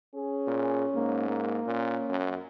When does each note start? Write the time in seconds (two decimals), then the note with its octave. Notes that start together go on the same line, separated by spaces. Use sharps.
0.15 C#4 G#4
0.47 A#2
0.95 G#2 A#3
1.29 A#3
1.66 A#2 C#4
2.10 F#2